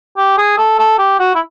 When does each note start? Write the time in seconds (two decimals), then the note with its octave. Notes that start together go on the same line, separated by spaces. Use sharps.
0.17 G4
0.38 G#4
0.58 A4
0.79 A4
0.99 G4
1.19 F#4
1.35 E4